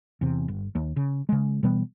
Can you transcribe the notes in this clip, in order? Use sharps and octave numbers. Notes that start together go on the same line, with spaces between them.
E2 C3
G1
D#2
C#3
C#3 G#3
B2 E3 G3 B3